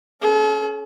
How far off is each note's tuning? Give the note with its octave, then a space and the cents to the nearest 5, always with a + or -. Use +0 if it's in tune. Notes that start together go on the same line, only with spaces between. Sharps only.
C#4 +0 A4 -45